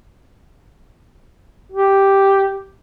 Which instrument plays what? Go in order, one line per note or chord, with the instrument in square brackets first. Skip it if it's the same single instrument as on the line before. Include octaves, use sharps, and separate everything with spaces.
[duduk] G4